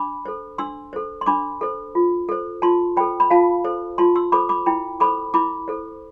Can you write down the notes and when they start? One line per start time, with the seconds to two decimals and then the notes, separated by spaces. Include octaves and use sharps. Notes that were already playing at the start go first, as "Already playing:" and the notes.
Already playing: D4 B5 D6
0.25 A4 C5
0.58 D4 C6 E6
0.93 A4 C5
1.21 C6
1.26 D4 B5 D6
1.61 A4 C5
1.95 F4
2.29 A4 C5
2.62 F4 A5 C6
2.97 A4 C5 G5 B5
3.20 B5
3.30 F4 F5 A5
3.64 A4 C5
3.98 F4 A5 C6
4.15 C6 E6
4.32 A4 C5 B5 D6
4.49 B5 D6
4.66 E4 G5 B5
5.00 A4 C5 B5 D6
5.34 E4 B5 D6
5.68 A4 C5